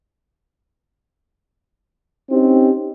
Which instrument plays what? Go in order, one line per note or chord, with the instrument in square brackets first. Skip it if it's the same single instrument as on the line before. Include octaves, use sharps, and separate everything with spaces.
[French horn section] C4 C#4 D#4 G4